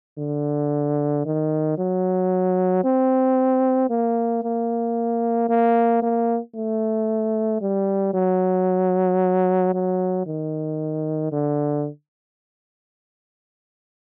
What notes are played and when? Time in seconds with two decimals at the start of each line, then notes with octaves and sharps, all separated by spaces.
0.18 D3
1.25 D#3
1.78 F#3
2.84 C4
3.90 A#3
4.43 A#3
5.49 A#3
6.02 A#3
6.55 A3
7.61 G3
8.14 F#3
9.74 F#3
10.27 D#3
11.32 D3